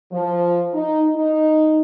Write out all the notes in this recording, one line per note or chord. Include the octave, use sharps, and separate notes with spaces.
F3
D#4
D#4